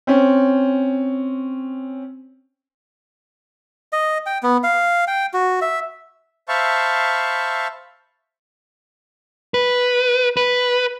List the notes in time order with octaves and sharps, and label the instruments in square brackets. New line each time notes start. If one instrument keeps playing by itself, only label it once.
[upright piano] C4 C#4
[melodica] D#5
G5
B3
F5
G5
F#4
E5
[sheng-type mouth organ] C5 E5 F5 A5 B5 C#6
[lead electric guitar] B4
B4